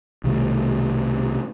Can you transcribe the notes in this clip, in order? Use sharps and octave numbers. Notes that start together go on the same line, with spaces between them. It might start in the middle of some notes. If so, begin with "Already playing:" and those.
C2 B2 D#3 A3